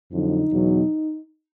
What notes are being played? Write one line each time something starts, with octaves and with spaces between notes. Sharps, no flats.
F2 D3 F#3 D#4
E2 B2 F#3